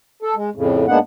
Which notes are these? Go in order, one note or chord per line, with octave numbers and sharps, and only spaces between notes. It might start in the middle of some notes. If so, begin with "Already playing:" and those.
A4
G#3
F2 A2 C#3
G#2 G#3 A#3 B3 D4 F#5